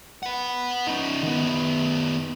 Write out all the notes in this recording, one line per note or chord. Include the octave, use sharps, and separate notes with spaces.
B4 F#5
C#4 D#4
D#3 B3